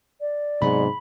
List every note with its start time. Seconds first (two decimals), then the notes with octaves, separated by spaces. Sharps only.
0.21 D5
0.62 G#2 C3 F#3 B3 B5